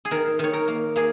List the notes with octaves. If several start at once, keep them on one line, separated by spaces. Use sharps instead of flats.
G#4
D#3 A#4
D#3 C#5
A#4
A#3
A#3 G#4